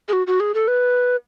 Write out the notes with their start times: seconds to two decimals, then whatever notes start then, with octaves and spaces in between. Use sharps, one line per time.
0.08 G#4
0.13 F#4
0.27 F#4
0.40 G#4
0.54 A4
0.68 B4